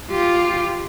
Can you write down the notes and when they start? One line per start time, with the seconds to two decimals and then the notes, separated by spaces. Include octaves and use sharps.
0.11 F4 G4